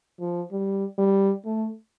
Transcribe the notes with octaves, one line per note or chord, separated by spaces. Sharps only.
F3
G3
G3
A3